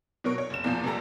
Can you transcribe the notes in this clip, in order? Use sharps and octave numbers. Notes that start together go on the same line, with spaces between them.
B2 F#3 A#4 C#6
C#5
F#1 E7
E2 A#2 F3
C#2 A#2 G3 A4 A5 A#5